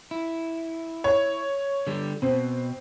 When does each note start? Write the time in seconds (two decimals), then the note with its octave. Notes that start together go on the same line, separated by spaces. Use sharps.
0.11 E4
1.04 C#5
1.87 D3 G3
2.22 B2 C4